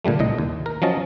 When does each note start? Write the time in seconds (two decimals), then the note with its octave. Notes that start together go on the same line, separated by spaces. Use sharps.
0.05 A#2 D3 G3 A3
0.19 C2 A2 D#5
0.38 D#2
0.66 A#4
0.82 F3 F#3 C#4 D#5 A5